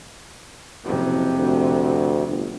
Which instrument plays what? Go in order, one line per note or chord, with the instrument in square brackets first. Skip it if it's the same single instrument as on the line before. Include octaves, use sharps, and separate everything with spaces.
[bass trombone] F#1 [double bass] F2 C3
[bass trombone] D2
G1